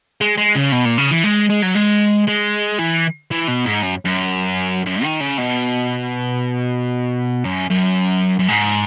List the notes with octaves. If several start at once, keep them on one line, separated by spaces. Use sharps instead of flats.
G#3
G#3
C#3
B2
A#2
C#3
E3
G#3
G#3
F#3
G#3
G#3
E3
E3
B2
G#2
F#2
F#2
F#2
D#3
C#3
B2
F#2
F#2
F#2
G#2